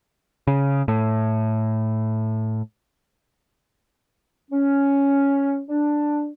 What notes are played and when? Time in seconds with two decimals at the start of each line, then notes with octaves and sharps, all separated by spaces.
0.47 C#3
0.88 A2
4.51 C#4
5.69 D4